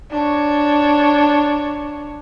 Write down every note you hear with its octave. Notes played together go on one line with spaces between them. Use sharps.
D4 C#5